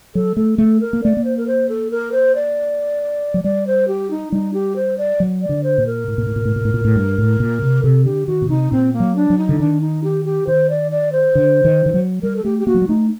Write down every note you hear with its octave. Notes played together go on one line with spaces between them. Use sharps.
F#3 A4
A3 A4
A3 A4
A#4
A#3
A3 D5
A#3
C5
A#4
C5
A4
A#4
C5
D5
F#3
G3 D5
C5
G4
D#4
G3 D#4
G4
C5
D5
F#3
D5
D3
C5
A#2
A#4
A2
A#2
A2
A#2
A2
A#2
A2
A#2
A2
G2
A2
A#2
C3
C3 A4
D3 G4
D#3 F#4
A#2
C3 D#4
A#2 C4
A#3
F#3
D4
F#3
D#4
D3
D#3 D4
D#4
G4
G4
D#3 C5
D5
D5
C5
D3
D#3
D#3
F#3
G3 A#4
A4
A3 G4
G4
A#3 F#4
F#3
G3
A3 D#4